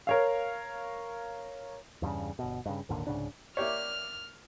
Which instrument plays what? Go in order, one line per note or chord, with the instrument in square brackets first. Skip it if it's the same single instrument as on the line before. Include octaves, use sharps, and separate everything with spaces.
[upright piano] A#4 C#5 F5
[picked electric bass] E2 G2 A#2 C#3
G1 B2
G2 C#3
G#1 D#2 A#2 D3
C2 G#2 C#3 D4
[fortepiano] A#3 G4 C#5 [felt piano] D5 E5 [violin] F6